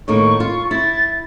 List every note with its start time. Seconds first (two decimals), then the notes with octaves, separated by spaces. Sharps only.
0.08 A2 D#3 A#3 C#6
0.40 F4
0.71 E4 A6